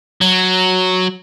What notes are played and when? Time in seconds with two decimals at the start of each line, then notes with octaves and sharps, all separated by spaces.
0.21 F#3